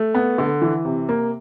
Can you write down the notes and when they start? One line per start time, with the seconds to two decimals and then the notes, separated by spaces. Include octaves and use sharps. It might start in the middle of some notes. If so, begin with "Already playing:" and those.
Already playing: A3
0.15 B3
0.38 D3
0.62 E3
0.85 C3
1.09 A#3